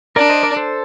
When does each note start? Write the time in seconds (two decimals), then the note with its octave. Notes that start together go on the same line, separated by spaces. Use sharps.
0.16 D4 A#4 D5
0.29 C5 D#5
0.43 A#4 D5
0.56 A4 C5